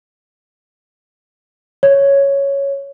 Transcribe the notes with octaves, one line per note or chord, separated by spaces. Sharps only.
C#5